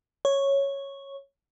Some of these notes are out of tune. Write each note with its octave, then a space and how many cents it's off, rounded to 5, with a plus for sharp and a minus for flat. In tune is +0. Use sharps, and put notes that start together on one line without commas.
C#5 -5